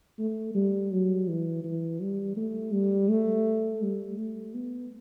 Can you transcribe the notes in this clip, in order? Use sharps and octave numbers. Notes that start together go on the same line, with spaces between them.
A3
G3
F#3
E3
E3
G3
A3
G3
A3
G3
A3
B3